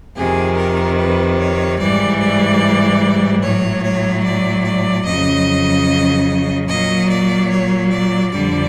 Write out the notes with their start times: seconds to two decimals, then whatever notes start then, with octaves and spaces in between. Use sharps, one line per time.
0.16 F2 C3 D#3 G#4
0.57 A#4
0.98 B4
1.38 C#5
1.79 G#2 E3 G3 D5
2.20 D5
3.42 A2 F#3 C#5
3.83 C#5
4.24 D5
4.65 D5
5.05 F2 C#3 F#3 D#5
6.68 A#2 F#3 D#5
7.09 D5
7.50 C#5
7.91 D5
8.31 F2 D3 G3 D5